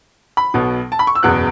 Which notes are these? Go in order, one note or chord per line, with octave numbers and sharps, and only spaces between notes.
B5
B1 B2 B3
A5
B5
C#6
E6
F#1 E2 B2 B3 F#6